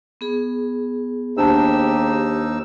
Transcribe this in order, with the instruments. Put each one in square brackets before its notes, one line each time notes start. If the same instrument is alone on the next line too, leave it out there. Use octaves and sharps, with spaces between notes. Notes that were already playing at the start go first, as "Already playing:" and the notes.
[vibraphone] B3 G#4
[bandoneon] D#2 D#4 E6 [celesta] D4 C5 A5 [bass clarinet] G4